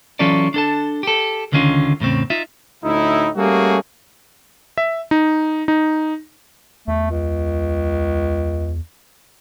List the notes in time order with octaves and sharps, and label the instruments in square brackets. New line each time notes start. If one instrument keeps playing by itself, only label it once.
[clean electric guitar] E3 F#3 C#4 F4 A4 D5
D4 A4 A5
G4 A4
C#2 D3 D#3 C#4 F4
E2 A2 C#3 C4
D#4 F4 E5
[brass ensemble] D2 A2 D#4 E4
G3 A3 A#3 C#4 F#4 G#4
[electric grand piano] E5
D#4
D#4
[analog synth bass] E2 [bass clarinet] A3
[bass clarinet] C#2